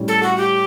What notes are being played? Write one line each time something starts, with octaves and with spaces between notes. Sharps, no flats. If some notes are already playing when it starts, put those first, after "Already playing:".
Already playing: A2 G3 C#4 E4
A4
F#4
G4